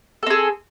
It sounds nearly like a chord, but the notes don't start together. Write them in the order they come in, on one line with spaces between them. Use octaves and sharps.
A4 C4 G#4